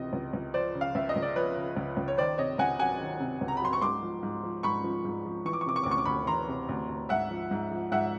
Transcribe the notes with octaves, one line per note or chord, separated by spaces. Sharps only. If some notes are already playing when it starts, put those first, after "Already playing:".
Already playing: C#2 C3 E3 D#5
C#2
C#2
F3 C5 D5
C#3
F5
C#2 E5
D#5
C#2
D5
F3 B4 C#5
C#3
C#2
C#2
C#5
D#3 C5 D5
C3 C#5 D#5
C#2 F#5 G#5
F#3 F#5 G#5
D#3
C3
C#2
A#5
B5
F#3 C6
C#6
G#2 C6 D6
F3
G#2
F3
G#2 B5 C#6
F3
G#2
F3
E3 C#6
D6
C#6
C3 D6
C#6
D6
D2
C#6
D6
D2 B5 C#6
E3 A#5 C6
C3
D2
D2
G#2 E5 F#5
F3
G#2
F3
G#2 E5 F#5